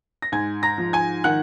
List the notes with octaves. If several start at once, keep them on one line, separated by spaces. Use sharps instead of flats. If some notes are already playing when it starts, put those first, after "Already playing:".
A#6
G#2 G#5 G#6
A#5 A#6
F3
G#5 G#6
D#3 F#5 F#6